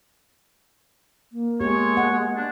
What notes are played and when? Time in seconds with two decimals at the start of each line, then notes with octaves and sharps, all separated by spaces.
1.32 A#3
1.60 G#3 B3 G4 C#5
1.97 F#5
2.37 D4